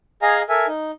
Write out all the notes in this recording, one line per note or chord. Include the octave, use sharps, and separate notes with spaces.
G#4 D#5 F5 G#5 A#5
A4 A#4 E5 G#5
D#4